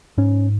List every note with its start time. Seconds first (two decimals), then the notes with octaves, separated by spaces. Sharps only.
0.18 G#2 C#4